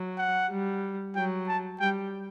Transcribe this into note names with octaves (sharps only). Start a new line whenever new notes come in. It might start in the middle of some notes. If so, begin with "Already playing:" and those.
Already playing: F#3
F#5
G3
F#3 G5
A5
G3 G5